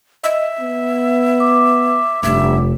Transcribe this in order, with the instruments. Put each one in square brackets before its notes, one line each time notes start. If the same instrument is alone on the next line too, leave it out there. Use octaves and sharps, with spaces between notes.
[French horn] D#5 [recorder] E5
[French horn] B3
[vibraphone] D6
[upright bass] F1 [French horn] G2 [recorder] E5